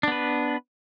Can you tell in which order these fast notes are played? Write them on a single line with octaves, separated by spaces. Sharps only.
D4 B3 B4